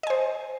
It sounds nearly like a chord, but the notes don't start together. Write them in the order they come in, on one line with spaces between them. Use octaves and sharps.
D#5 G#5 C5